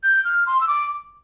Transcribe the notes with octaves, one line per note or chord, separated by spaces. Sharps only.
G6
F6
C6
E6
D6